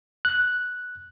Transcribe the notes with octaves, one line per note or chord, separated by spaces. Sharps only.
F#6